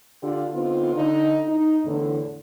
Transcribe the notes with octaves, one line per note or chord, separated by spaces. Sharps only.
D3 D4 F4 G4 D5
D3 B3 C4 D#4 F4
D3 D#4
D#4
E2 A2 D3